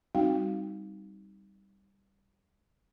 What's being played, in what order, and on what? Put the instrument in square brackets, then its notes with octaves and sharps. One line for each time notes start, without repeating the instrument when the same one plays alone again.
[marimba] G3 C4 D#4 F#4 F5 G5